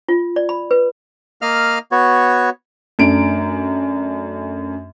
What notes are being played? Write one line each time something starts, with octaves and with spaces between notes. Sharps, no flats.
F4
D5
B5
B4
A#3 D#5 F5 F6
B3 F#4 C#5
F#2 A3 D4 D7